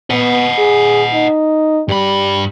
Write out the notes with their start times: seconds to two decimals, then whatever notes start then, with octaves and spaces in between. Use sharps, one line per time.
0.10 B3 D#5 F#5
0.58 G#4
1.13 D#4
1.89 G2 G3 B5